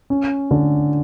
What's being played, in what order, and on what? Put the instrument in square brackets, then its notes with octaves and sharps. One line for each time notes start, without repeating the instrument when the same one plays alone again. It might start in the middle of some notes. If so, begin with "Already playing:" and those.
[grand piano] C#4
D3